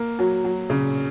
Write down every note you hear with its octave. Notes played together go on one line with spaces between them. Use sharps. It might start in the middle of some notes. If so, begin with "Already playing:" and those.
Already playing: A#3
F#3
F#3
C#3